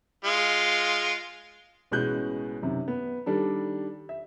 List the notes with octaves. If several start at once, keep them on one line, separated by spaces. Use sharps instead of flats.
G#3 F4
A1 B2 G#3 C#4 F#6 G6
F#2 C3 D#3
B3
D#3 G3 D4 A4
E5